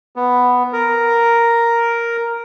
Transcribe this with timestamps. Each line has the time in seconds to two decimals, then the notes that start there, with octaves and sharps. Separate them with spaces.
0.16 B3
0.73 A#4